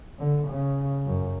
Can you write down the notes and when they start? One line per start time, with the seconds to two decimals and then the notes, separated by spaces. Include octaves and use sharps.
0.19 D3
0.48 C#3
1.06 F#2